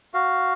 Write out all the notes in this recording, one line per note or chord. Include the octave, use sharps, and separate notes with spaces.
F#4 F5